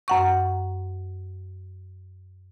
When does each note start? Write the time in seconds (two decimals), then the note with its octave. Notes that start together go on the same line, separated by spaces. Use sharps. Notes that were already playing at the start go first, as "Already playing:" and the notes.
0.08 F#2 F#5 C#6